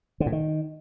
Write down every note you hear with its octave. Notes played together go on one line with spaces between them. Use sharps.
D3
A2
D#3